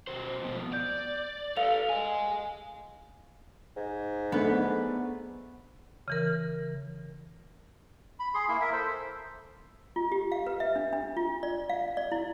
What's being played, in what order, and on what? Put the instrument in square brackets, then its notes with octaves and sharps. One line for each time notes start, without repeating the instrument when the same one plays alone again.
[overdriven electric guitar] B2 C5
F2 B2
[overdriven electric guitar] D5 [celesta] G6
[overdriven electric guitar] A4 B4 [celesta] F5 F7
[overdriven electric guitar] D#5 G#5
[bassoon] G#2
[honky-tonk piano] A3 D4 [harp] B3
[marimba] C#3 E3 A#4
[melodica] B5
G#4 C6
A#3 E4
A#4 E5
A4 C5
[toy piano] F4
G4
F5
B4
E5
D4
D4
F4
D5
F5
D5
E4